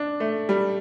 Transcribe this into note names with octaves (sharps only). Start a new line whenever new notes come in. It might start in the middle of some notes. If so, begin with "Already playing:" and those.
Already playing: D4
A3
G3